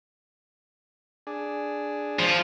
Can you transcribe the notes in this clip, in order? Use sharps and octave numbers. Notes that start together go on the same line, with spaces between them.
D4 G#4
F3 F4